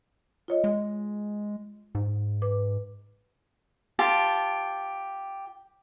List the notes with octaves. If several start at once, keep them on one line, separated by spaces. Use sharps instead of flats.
F4 C#5 D#5
G#3
G#2
B4 D6
F4 G4 A5